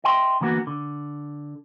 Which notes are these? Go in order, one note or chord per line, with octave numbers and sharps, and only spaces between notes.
D#5 E5 G5 C6
D3 E3 A#3 B3 F#4
D3